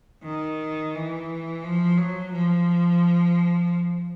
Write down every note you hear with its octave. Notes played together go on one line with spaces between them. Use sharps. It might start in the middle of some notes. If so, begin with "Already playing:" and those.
D#3
E3
F3
F#3
F3